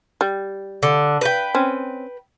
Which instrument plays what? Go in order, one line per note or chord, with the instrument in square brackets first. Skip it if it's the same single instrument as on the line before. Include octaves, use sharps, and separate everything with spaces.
[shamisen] G3
[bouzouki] D3
B4 G5
[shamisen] C4 C#4